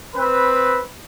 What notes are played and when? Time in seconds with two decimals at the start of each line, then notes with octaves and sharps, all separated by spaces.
0.15 C4 B4